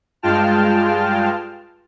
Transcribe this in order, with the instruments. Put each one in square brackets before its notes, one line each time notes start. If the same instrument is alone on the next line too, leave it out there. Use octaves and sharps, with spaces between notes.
[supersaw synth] G2 G#3 F4 G5 A5 F6